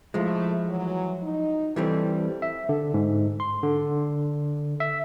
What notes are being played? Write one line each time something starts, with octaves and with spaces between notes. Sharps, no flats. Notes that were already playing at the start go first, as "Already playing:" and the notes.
F3 G#3 A3 E4
E3 F#3
D#4
E3 G3 C4 A4
E5
D3
G#2
C6
D3
E5